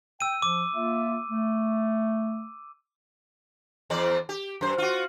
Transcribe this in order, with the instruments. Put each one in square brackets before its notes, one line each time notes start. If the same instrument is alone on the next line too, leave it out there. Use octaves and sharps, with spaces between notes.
[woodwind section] G5 [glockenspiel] E6 D#7
[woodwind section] F3 [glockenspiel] D6
[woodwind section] A#3 F4 E5
A3
[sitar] E2 C4 D5
G4
F#2 C5
F4 F#4